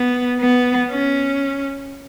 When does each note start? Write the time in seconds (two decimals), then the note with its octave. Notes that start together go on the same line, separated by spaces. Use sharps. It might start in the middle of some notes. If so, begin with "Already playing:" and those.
Already playing: B3
0.41 B3
0.91 C#4